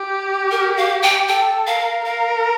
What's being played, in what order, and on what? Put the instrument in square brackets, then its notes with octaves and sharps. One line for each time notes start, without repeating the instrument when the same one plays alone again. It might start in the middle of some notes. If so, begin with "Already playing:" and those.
Already playing: [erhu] G4
[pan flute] A#4
F5
G5
[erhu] A4 [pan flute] G5
[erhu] A#4 [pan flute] F5
[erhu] A#4 [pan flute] F5